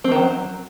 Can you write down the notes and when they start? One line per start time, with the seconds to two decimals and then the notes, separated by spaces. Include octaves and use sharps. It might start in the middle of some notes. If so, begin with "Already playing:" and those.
0.04 C4
0.12 D#3
0.19 F#3